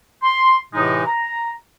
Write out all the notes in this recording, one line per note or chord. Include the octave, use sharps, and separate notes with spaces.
C6
A2 C3 E3 G#3 D#4
A#5